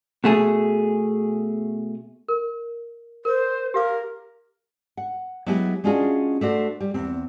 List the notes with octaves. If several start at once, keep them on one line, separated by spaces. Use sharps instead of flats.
B2 A3 G#4
A#4
A#4 C5
G4 A#4 F5 D6
F#5
F#3 G#3 B3 E4 G4 B4
G#3 C#4 D4 F4 F#4 G#4
A3 D4 F#4 C5
G3
E2 C4